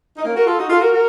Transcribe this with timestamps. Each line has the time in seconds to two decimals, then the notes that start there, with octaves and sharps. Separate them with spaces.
0.17 D#4
0.24 A#3 C#4
0.36 F#4 A#4
0.46 F4 A4
0.58 D#4 F#4
0.70 F4 A4
0.81 F#4 A#4
0.92 F#4 A#4